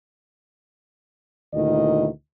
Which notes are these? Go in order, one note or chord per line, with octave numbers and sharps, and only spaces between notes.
D2 A#2 D#3 E4 D#5